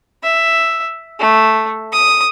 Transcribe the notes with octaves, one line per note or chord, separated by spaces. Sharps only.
E5
A3
D#6